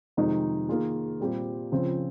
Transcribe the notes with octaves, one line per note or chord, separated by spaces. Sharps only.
F2 C3 D#3 G#3 D#4
D#3 A#3 F4 G#4
A#2 G3 C4 G4
C#2 C#3 F3 C4